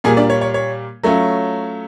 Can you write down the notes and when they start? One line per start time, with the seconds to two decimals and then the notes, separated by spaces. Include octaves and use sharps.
0.04 A#2 G3 A#3 G#4 G#5
0.17 D4 D5
0.30 C#5
0.41 C#5
0.54 C#5
1.03 F#3 A3 C#4 F4